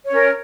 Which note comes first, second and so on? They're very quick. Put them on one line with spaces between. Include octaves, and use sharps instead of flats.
C#5 C#4 A#4